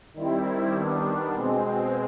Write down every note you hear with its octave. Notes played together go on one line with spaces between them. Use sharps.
D#3 G3 C4 E4
D#3 G3 B3 D4
B2 G#3 C4